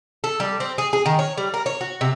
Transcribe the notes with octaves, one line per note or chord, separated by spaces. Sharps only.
A4
G3
C4
G#4
G#4
D#3
C#5
G3
A#4
C#5
F#4
C3